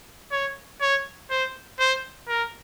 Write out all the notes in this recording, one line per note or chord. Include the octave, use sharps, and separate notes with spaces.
C#5
C#5
C5
C5
A#4